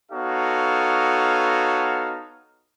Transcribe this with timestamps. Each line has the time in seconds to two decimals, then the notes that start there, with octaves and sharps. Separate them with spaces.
0.12 B3 D#4 F#4 A4 C#5 F5